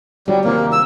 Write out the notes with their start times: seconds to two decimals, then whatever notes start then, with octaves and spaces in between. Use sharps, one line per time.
0.28 G1 G2 F#3 G3
0.45 D#2 C3 F3 A#3
0.72 E6